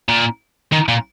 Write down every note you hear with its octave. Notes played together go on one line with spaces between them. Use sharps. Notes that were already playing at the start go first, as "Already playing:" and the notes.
A#2
D#3
A#2